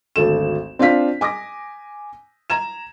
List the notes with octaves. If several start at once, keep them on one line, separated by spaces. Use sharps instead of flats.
G#1 D2 A4 E7
C4 D4 F4 F5 B6
G#5 D6 D#6 A#6
A#5 G#6 E7